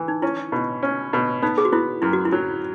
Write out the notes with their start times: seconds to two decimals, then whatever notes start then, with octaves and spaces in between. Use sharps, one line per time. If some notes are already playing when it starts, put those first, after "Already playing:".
Already playing: E3
0.08 D#4
0.22 C#4 E4
0.52 B2
0.83 C#4
1.13 B2
1.42 B3 D#4
1.58 G#4
1.65 F#4
1.72 B3 E4
2.02 F#2 E4
2.13 F#4
2.25 E4
2.32 F#3